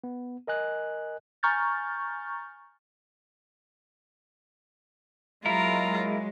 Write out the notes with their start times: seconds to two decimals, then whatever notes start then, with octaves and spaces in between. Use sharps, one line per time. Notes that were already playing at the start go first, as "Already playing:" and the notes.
0.04 B3
0.47 A#4 D#5 G#5 F#6
1.43 G#5 A#5 C#6 F6 G6 A6
5.46 F#3 G#3 A#3 E4 F4 A#4 A#5